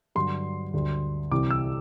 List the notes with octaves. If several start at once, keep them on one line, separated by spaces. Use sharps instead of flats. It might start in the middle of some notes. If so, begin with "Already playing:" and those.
G2 D3 F#3 C6
D2 D3 G3
C2 C3 E3 G3 D6
E6